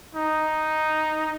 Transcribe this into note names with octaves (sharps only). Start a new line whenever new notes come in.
D#4